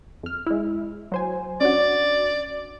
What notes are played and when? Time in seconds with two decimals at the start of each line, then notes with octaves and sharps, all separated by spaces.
0.23 F2 F6
0.46 G#3 E4
1.12 F#3 C5 G#5
1.61 C#4 D4 F#4 D5